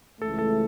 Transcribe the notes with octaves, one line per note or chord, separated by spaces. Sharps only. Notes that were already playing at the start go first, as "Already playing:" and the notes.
C#2 C#3 E3 A3 A4
A4